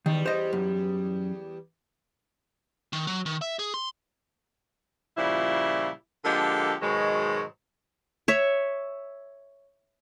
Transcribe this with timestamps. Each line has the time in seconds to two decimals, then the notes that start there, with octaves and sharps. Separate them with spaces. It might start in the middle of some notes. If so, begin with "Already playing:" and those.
0.06 E2 D#3 G3
0.26 C5 D#5
0.53 F#2
2.93 D#3
3.07 F#3
3.26 D#3
3.41 E5
3.59 G#4
3.74 C6
5.17 A#2 C#3 F3 G3 E4
6.24 D3 F3 G#3 A#3 G4 A4
6.81 G#2 B2 D#3 F#3 G#3
8.28 C#5 E5